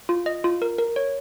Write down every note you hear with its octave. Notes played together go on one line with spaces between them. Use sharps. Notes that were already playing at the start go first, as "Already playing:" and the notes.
F4
D#5
F4
A#4
A#4
C#5